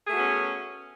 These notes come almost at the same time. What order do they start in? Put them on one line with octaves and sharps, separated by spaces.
G#4 A3 F#4 B3 C#4